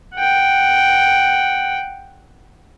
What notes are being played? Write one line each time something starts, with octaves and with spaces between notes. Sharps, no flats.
F#5 G5